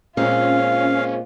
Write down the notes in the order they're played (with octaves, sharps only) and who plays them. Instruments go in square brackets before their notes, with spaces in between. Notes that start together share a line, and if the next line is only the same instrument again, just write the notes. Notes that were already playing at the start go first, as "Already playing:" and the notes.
[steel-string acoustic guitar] A#2 G#3 C4 [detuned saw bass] C#4 [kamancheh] F4 [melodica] F5